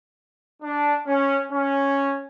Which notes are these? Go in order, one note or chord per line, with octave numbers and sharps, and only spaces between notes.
D4
C#4
C#4